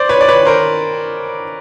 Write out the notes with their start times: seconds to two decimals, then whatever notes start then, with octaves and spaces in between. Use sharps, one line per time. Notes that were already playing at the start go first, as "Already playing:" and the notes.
Already playing: C5 D5
0.09 B4 C#5
0.21 D5
0.28 B4 C#5
0.45 A#4 C5